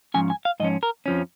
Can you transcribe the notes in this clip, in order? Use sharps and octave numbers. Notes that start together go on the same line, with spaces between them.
G#2 F3 C#4 G#5
G#5
F5
G#2 F3 C#4 D#5
A#4
F2 F3 C#4